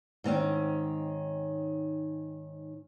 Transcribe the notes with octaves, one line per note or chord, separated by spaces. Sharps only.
G#2 D#3 C4 C#4